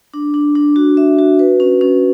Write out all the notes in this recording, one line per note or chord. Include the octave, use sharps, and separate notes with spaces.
D4
D4
D4
F#4
E5
F#4
B4
C#4
C#4